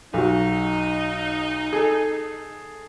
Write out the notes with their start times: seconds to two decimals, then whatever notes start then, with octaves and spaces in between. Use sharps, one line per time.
0.14 B1 D#4 F#4
1.73 G#4 A4